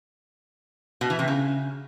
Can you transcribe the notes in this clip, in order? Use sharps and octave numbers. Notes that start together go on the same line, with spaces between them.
B2
E3
C3
C#3